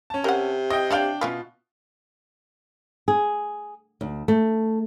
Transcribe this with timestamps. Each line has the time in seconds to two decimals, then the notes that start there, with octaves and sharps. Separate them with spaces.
0.10 C#4 A5
0.24 C3 A#4 F#5
0.70 E4 D#5 G5
0.91 D4 C#5 D5 F5 G5
1.21 B2 C#4 E4 F4 B4
3.08 G#4
4.01 D2
4.28 A3